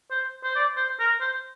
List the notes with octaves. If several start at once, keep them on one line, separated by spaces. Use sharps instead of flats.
C5
C5
D5
C5
A#4
C5